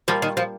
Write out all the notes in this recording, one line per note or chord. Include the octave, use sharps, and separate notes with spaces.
F3 G3 A#3 F4
D#3
F3